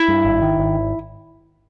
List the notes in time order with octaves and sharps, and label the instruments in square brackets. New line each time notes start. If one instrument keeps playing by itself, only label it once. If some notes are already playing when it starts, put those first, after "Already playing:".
Already playing: [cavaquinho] E4
[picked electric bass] G2
G#1
D#3
G#1